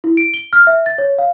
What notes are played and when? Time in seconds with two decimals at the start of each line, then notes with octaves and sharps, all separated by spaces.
0.04 E4
0.17 D7
0.34 G7
0.53 F6
0.67 E5
0.86 A6
0.98 C#5
1.18 F5